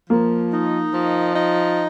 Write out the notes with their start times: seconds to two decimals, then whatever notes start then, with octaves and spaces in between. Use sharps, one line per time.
0.10 F3 A#3
0.52 D#4
0.93 F3
1.35 D#4